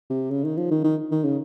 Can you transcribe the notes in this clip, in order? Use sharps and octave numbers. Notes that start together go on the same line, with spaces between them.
C3
C#3
D#3
F3
D#3
D#3
D#3
C#3